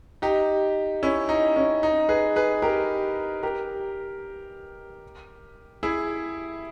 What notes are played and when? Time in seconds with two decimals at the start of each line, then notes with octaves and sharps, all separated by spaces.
0.22 D#4 G4
1.03 C#4 E4
1.29 D#4
1.56 C#4
1.83 D#4
2.09 G#4 B4
2.36 G#4 B4
2.62 G4 A#4
3.43 G4 A#4
5.83 E4 G#4